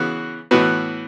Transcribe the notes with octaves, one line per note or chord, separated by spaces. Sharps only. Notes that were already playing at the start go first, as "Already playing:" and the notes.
Already playing: C#3 E3 B3 F#4
A2 E3 B3 F#4 B4